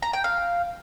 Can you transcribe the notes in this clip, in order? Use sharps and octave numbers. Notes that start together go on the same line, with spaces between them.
A#5
G5
F5